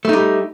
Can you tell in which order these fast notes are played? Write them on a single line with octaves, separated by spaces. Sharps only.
A3 D#4 G3